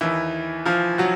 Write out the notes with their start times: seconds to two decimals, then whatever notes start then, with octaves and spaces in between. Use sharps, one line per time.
0.01 D#2 D#3 E3 E4
0.66 F3 F4
0.98 F#3 F#4